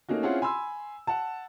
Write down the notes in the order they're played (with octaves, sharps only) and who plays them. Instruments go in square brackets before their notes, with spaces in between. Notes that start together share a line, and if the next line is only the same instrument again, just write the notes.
[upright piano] A3 A#3 C#4 D#4 F#4
C4 C#4 E4 F4 G#4 F#5
G#5 B5 C6 E6
F#5 A5